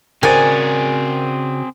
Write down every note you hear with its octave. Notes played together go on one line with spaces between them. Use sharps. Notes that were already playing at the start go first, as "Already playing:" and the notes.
C#3 C4 F#4 G#4 A#4 C5 D5 G#5